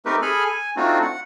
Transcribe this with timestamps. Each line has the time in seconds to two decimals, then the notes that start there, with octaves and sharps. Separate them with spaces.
0.05 A3 C4 D#4 G4 A#4 B4
0.22 G#4 A4 G#5 B5 F6
0.45 G#5
0.77 A3 C4 D4 D#4 F4 F#4
1.02 F#5